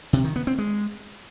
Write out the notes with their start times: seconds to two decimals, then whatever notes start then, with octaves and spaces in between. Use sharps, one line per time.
0.13 C3
0.24 D#3
0.36 B3
0.47 C4
0.58 G#3